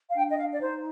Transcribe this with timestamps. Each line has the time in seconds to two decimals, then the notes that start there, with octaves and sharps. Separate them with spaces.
0.09 F5
0.15 D4 G5
0.30 D#5
0.38 F5
0.53 D5
0.60 D#4 C5